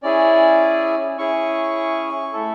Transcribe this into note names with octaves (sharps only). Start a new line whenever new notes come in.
C#4 E4 G#4 D5
C#4 E4 G#4 C#6
A3 E4 A4